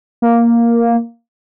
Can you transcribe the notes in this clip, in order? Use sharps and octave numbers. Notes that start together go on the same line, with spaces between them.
A#3